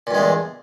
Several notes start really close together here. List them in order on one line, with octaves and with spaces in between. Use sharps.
A#2 G2 G#3 E2